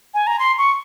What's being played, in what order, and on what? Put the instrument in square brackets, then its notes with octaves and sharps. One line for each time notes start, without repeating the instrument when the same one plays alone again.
[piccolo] G#5
A#5
C6
C#6